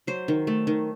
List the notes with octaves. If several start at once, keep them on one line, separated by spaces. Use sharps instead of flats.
F#3 C5
D#3
A3
D#3